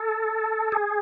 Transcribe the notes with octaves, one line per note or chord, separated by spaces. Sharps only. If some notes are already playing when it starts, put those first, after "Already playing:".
Already playing: A4
G#4